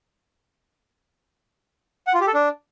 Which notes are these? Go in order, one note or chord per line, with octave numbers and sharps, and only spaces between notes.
F#5
F4
G4
A4
D4